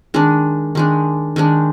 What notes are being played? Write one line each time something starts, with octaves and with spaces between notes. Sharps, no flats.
D#3 G#3 D4
D#3 G#3 D4
D#3 G#3 D4